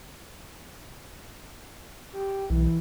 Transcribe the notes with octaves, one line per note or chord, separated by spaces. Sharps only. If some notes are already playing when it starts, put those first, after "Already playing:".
G4
B1 E3